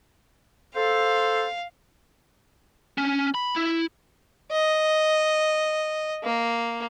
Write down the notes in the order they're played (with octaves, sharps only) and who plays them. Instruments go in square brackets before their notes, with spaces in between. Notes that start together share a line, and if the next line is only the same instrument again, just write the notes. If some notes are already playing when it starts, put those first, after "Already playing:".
[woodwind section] A4 C5 [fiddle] F5
[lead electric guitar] C#4
B5
E4
[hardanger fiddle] D#5
A#3